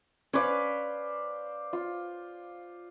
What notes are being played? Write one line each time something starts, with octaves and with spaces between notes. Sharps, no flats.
C#4 B4 C5 D5 F5
F4